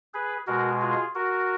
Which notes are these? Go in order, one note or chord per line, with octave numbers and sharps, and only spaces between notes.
G#4 B4
B2 G#3 F#4 A#4
F4 G#4
F#4 A#4